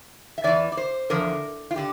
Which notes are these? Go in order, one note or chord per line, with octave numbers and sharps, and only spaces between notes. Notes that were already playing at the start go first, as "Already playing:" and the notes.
E5
E2 E3 D5
D5
C5
E2 D3 F3 A#4
F4
D3 G4